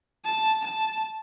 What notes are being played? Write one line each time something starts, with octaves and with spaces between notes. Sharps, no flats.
A5
A5